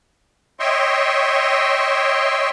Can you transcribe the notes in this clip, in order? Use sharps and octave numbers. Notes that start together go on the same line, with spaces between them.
C#5 D#5 E5 G5 C6 C#6